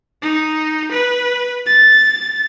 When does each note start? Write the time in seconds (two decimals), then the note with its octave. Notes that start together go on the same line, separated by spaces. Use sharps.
0.22 D#4
0.92 B4
1.66 A6